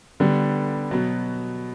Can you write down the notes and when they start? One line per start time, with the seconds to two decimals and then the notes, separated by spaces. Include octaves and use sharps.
0.20 D3 G3 B3
0.91 B2 F#3 B3